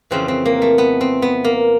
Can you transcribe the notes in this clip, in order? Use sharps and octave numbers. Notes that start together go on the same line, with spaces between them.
F2 C#3 E3 C4
C4
A#3
A3
B3
C4
B3
A#3